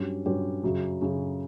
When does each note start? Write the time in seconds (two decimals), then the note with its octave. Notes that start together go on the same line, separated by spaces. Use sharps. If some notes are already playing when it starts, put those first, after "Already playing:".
Already playing: G2 F#3 C#4 G4
0.26 G2 F#3 C#4 G4
0.63 F#2 C#3 F#3
1.01 F#2 C#3 F#3